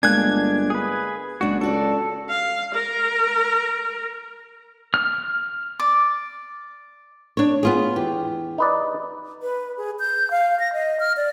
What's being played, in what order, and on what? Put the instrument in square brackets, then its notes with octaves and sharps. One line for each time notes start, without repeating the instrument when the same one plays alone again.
[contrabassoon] G1 [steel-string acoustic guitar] G#3 A#3 [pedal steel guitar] D4 G#5 F#6 [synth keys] G#6
[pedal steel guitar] G#4 B4
[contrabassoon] F#1 [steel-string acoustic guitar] G#3 D4 [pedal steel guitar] F#4
[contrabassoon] C#2 [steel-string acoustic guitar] D4 F#4 D5 [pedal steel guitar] A4
[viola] F5
A#4
[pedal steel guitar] F6
[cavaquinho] D5 D6
[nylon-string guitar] D4 C#5
B3 F4 G#4
[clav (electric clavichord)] E2 [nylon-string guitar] G4
[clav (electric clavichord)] D#4 B4 D5
[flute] B4
G#4
G6
F5
A#6
D#5
F6
D5